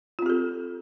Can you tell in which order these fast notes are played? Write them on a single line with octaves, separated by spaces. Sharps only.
F4 C4 G4 A4